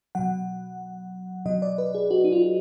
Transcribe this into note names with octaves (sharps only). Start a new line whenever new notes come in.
B2 F#3 F#5
B2 F#3 D#5
D5
B4
G#4
F#4
D#4
F4